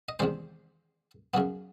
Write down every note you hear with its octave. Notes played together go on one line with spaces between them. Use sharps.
D#5
E2 C3 D#3 G#3 C5 D5
F#2 C#3 F#3 B3